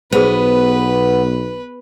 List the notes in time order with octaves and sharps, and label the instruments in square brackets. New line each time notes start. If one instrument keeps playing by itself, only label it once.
[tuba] B1 [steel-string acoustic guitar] B3 [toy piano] G#4 C5 [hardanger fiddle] B4